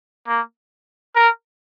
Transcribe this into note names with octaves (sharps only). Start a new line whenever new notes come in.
A#3
A#4